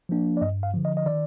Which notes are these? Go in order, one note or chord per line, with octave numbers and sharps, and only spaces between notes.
F3 A#3 D4
D5
G2 D#5
F5
D3 F3
D#5
D#5
D#3 D5